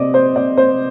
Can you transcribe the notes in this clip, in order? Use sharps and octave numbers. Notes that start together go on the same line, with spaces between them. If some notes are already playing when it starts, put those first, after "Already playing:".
Already playing: C3 C4 D5 D#5
C5
D5
C5